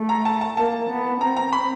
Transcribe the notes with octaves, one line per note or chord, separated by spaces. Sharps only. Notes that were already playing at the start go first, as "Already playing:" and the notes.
Already playing: A3
A#5
A5
A5
A#3 A5
B3
C4 A#5
A#5
B5